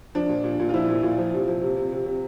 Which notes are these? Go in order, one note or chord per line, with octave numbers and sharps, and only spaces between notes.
F3 D4
A#2
A#2
A#2
F4
F3 E4
A#2
A#2
F3
C3
F3
C3
C3
C3
C3